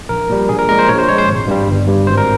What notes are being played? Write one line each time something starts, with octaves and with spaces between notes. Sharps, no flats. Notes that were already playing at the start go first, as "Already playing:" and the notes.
A#1 A#4
A#2 G3
A#1 G#4
A#4
A#2 G#3 A#4
C5
A#1 C#5
C5
A#2 G#3 C#5
C5
G#1
G2 G3
G1
G2 G3
G#1 C5
A#4